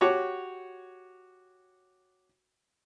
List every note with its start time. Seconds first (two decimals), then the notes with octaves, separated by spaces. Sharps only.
0.01 F#4 G4 C#5 D6